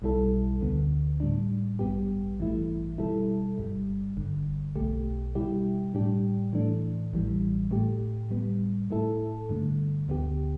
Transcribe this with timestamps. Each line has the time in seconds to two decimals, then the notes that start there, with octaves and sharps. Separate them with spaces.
0.02 B1 B2 G3 E4 A4
0.61 D2 D3 B3
1.20 A2 G3 D4
1.79 A1 G2 G3 B3 G4
2.39 A1 G2 E3 A3 E4
2.98 B2 G3 E4 A4
3.58 G1 G2 G3
4.17 G1 G2 D3
4.76 B1 B2 A3 G4
5.35 B2 G3 E4 G4
5.94 A2 G3 D4 G4
6.53 A2 E3 A3 D4
7.12 A1 A2 E3 G3
7.71 A2 A3 G4
8.30 A2 G3 B3
8.90 A2 A3 E4 A4
9.49 G2 D3 A3
10.08 D2 D3 B3 G4